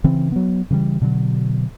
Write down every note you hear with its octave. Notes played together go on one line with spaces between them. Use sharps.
C#3 E3 C4
F#3 B3
C#3 E3 F#3 G3
B2 D3 E3 F#3